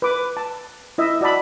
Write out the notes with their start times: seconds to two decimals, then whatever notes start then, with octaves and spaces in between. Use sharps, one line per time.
0.02 B4 D6
0.37 A5
0.98 E4 D#5 E5
1.21 F#4 D5 D#5 A5 B5